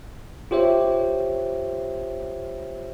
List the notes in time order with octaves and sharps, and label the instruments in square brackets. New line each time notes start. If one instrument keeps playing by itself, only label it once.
[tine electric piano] F4 G4 C5 C#5 E5